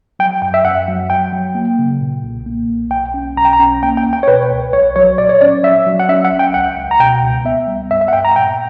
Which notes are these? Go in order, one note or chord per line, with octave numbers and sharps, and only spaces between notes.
F#3 G5
F#2 G5
E5
F#2 F#5
F#3
F#3 G5
F#3
A#3
C#3
A#2
B1
A#3
B1
B1 G5
C#4
B1 A#5
G5
A#5
C#4
A#3 G5
G5
C#2
G5
C#5
B2 B4
C#2
B1 C#5
F#3 C#5
A#2 D5
C#5
C#4 D5
F#3 E5
F#3
F#5
C#4 E5
F#5
A#1
G5
C#2 F#5
C#2
A#5
B2 G5
C#2
B3 E5
G3
G2 E5
E5
F#5
G2 G5
A#5
A#2 G5